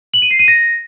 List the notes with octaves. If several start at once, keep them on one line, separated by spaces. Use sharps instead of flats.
F#7
D#7
C7
D#7
A#6